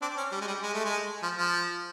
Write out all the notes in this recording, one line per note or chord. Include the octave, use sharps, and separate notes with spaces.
C4 D4
C#4
G3
G#3
G3
G#3
A3
G#3
F3
F3